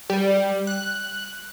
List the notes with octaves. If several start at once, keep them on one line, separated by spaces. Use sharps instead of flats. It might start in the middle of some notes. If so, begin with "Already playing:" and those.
G3
F#6